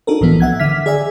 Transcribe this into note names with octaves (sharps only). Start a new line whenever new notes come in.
D4 D#4 F#4 A4 A#4
C2 A2 E3 F3 B3
E5 F#5 G#6
D3 E5 F6 B6
G#4 D5 E5 G#5